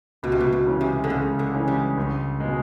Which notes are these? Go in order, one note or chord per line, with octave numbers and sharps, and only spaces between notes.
C#2 B2
C3
B2
B2
C#3 E3 G#3 C#4
C3
D3
C#2 C#3
D3
C#3 E3 G#3 C#4
G3
C#2
B2 G#3